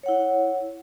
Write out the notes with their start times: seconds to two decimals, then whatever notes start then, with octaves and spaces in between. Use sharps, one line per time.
0.03 C#5
0.06 F#5
0.09 E4